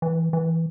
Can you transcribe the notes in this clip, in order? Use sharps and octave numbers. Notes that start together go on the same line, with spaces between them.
E3
E3